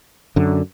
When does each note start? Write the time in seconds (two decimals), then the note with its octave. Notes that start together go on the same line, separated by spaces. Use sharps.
0.36 F#2 D3